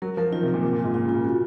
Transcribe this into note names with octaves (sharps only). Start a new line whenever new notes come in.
F#3 A#4
F3 A#4
D#3 F4
C3
F4
A#2
C3 F4
A#2
G#2 F4
A#2 F4
C#3
F4
C#3
F#4